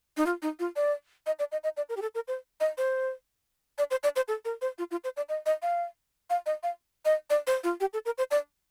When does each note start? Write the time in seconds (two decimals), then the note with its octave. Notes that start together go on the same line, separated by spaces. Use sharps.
0.17 D#4
0.26 F4
0.42 D#4
0.59 F4
0.76 D5
1.26 D#5
1.39 D5
1.52 D#5
1.64 D#5
1.77 D5
1.89 A#4
1.97 G4
2.02 A4
2.15 A#4
2.28 C5
2.60 D#5
2.78 C5
3.78 D5
3.91 C5
4.03 D5
4.16 C5
4.28 A4
4.45 A#4
4.62 C5
4.78 F4
4.91 F4
5.04 C5
5.17 D5
5.29 D#5
5.46 D#5
5.62 F5
6.30 F5
6.46 D#5
6.63 F5
7.05 D#5
7.30 D5
7.47 C5
7.64 F4
7.80 G4
7.93 A4
8.05 A#4
8.18 C5
8.31 D5